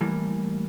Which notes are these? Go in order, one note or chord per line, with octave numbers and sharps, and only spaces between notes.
A2 E3 G3 A#3